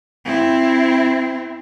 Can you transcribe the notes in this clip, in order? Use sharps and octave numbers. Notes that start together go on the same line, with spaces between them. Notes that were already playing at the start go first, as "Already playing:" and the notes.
C4 E4